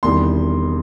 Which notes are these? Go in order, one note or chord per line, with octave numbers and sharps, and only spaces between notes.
E1 E2 C3 D#3 G3 C6